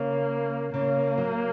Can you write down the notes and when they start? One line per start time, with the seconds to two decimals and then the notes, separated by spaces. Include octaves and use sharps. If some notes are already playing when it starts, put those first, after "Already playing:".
Already playing: C#3 A#3
0.73 C#3 A#3
1.18 F#3